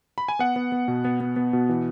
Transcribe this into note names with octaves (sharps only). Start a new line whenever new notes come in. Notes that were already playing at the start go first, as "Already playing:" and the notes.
B5
G#5
B3 F#5
B3
B3
B2
B3
B3
B3
B2
E3